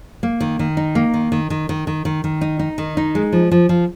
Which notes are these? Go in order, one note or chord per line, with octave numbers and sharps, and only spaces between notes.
A#3
D#3
D#3
D#4
A#3
D#3
D#3
D#3
D#3
D#3
D#3
D#3
D#4
D#4
D#3
D#4
G#3
F3
F3
F3